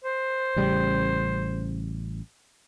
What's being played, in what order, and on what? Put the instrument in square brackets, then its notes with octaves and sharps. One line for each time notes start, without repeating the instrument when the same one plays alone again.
[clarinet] C5
[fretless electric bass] A1 C#3 G3